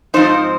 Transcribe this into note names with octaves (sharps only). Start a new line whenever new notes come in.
G#2 F3 C4 D#4 C5